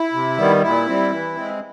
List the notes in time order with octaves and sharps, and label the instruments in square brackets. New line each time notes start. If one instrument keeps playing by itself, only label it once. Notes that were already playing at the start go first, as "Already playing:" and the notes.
Already playing: [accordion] E4
C3
D#3 G3 B3
A#2 E4
G3 C4
E3
G#3 C4